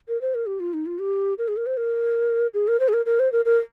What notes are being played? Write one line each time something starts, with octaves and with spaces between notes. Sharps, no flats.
A#4
C5
A#4
G4
F4
D#4
F4
G4
A#4
G#4
A#4
C5
A#4
G#4
A#4
C5
G#4
A#4
A#4
C5
A#4
A#4